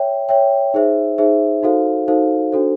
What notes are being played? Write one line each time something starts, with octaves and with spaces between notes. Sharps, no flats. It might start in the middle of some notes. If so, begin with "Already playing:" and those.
Already playing: C#5 E5 G5
C#5 E5 G5
D#4 G#4 C5 E5
D#4 G#4 C5 E5
D#4 F#4 A4 C5 F5
D#4 F#4 A4 C5 F5
D4 F#4 A4 C5